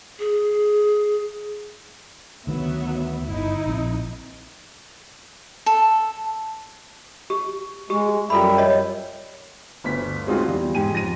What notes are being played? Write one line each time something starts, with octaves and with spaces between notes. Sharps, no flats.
G#4
D2 D#3 F#3 B3 E5
G1 D#4 E4
A#1 C4
A4
G4
G#3 G4
F#2 G3 F4 A4 E5 B5
C#5 D#5
G1 D2 B6
G#3 C4 D#4 F4 F#4 G#4
E2 G3
G#2 G4 G#5 D#7
F2 A#6 D#7